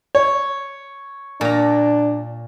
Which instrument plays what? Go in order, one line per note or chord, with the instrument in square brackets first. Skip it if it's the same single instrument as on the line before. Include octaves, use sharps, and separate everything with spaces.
[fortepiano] C#5
[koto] A#2 A#5 [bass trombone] D4